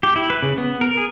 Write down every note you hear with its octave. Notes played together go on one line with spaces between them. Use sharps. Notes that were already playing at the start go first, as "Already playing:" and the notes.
G4
E4
B4
C#3
B3
A#4
G#4